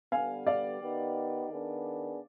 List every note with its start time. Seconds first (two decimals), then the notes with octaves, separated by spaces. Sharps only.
0.12 D3 G3 B3 F5 G#5
0.47 D5 F5
0.81 D#3 B3 D#4 G4
1.50 D#3 B3 D4 G#4